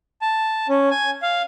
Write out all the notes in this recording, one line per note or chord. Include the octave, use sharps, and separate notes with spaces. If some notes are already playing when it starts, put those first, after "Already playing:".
A5
C#4
G#5
F5